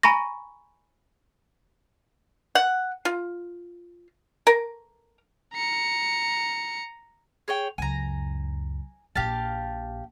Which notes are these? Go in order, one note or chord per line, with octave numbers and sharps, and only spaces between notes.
G#5 A#5 B5 C#6 A#6
F#5
F4
A#4
A#5 C#7
G#4 C#5 G5
C#2 F#2 G#5 A#5
A#1 A#2 G4 F5 A5